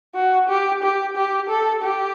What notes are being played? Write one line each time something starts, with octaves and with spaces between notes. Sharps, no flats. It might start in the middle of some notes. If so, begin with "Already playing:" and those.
F#4
G4
G4
G4
A4
G4